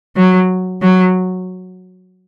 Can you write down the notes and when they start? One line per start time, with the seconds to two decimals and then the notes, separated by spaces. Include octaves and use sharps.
0.16 F#3
0.82 F#3